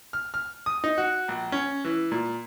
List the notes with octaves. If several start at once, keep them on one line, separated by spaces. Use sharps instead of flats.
F6
F6
D#6
D#4
F#4
A#1
C#4
E3
A#2